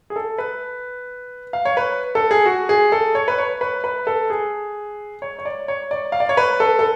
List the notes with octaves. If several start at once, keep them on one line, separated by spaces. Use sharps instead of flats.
G#4
A4
B4
F5
C#5
B4
A4
G#4
F#4
G#4
A4
C#5
B4
C#5
B4
B4
A4
G#4
C#5
C#5
D5
C#5
D5
F5
D5
C#5
B4
A4
A4